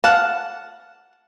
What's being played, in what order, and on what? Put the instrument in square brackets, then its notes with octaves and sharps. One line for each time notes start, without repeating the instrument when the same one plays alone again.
[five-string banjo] F5 F#5 A5